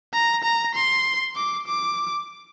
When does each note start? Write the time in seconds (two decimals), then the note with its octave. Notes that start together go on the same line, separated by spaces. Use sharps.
0.13 A#5
0.44 A#5
0.75 C6
1.36 D6
1.67 D6